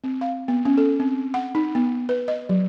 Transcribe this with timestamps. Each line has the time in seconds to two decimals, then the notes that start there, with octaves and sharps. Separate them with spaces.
0.04 C4
0.21 F5
0.48 B3
0.65 C#4
0.77 A4
1.00 C4
1.34 F#5
1.55 D#4
1.75 B3
2.09 B4
2.28 D#5
2.49 F#3